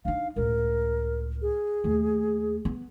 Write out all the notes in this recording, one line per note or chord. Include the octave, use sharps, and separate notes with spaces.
D4 D#4 F5
C#2 A2 A#4
G#4
D#2 A3
B3